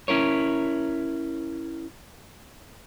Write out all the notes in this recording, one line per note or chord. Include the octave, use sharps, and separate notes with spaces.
C#4 E4 A#4 C#5